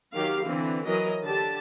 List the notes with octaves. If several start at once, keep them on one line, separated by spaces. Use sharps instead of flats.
D#3 F#3 G4 F5
D3 E3 C4
E3 F#3 A#4 D#5
D3 G4 A5